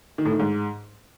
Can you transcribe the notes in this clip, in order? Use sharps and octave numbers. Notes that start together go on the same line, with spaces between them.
D#3
A2
D#3
G#2